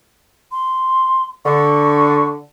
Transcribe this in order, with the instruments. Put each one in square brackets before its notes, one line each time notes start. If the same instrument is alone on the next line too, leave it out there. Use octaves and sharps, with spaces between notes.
[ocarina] C6
[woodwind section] D3 [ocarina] C#6